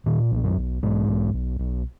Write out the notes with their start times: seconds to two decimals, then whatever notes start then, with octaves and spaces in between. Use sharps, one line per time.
0.06 A#2 D#3
0.32 B1
0.44 F#2 F#3
0.57 B1
0.82 B1 G#2 G#3
1.09 B1
1.34 B1
1.59 B1